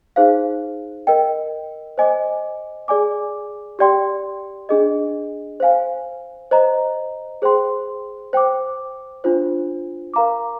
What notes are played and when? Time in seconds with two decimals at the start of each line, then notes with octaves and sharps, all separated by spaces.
0.16 D#4 G#4 C5 F5
1.07 A#4 D#5 G5
1.98 C5 D#5 G#5 D6
2.88 G#4 D5 G#5 D6
3.79 G4 D5 G5 C6
4.69 D4 G#4 D#5
5.60 C5 F5 G#5
6.51 C5 D#5 A#5
7.42 G#4 C5 G5 C6
8.33 C5 G5 D6
9.24 D4 F4 C5
10.14 A#4 F5 A#5 D6